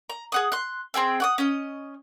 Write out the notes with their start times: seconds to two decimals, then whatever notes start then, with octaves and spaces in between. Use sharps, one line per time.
0.10 A#5
0.32 G#4 F#5 D#6
0.52 C6 F#6
0.94 C4 G#4 G5 E6
1.20 F#5 D6 D#6
1.38 C#4 D#5